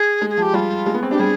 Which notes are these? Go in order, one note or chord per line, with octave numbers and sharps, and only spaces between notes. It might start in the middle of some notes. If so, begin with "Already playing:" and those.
Already playing: G#4
G#3
G#4
F3 G4
G3 F4
G#3
B3
C4
D4 G4
G3 G#4